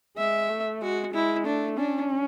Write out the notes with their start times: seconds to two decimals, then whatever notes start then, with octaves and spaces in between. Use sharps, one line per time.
0.17 G#3 E5
0.50 A3
0.82 G#3 F#4
1.14 G#3 E4
1.45 A3 D4
1.77 C#4 D4